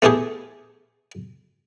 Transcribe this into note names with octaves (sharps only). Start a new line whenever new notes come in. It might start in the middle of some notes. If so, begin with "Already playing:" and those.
A3 B3 E4 G4 G#4